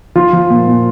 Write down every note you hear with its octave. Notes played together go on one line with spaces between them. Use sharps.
F3 F4
F3
A#2
A#2